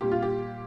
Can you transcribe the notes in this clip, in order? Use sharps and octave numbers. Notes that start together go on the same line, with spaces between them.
A#2 G3 G4
F4
G4